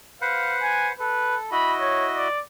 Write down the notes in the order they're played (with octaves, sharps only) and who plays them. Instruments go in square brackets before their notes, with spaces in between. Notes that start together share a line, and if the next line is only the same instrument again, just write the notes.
[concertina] B4 C5 F#5 [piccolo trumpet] F5
[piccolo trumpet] G#5
[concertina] A4 [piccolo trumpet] B4
[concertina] E4 F#4 D#5 [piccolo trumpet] B5
[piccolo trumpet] C#5
D5